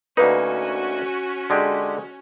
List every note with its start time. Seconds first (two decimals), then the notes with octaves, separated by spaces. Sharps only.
0.17 D2 A#3 C#4 D#4 F#4 B4
1.50 D3 G#3 G4